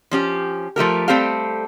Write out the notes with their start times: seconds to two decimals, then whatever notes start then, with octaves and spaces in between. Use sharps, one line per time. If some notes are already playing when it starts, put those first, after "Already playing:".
0.11 F3 C#4 G4
0.76 F3 A3 G4 A#4
1.08 G3 A3 C4 G4 A4 F5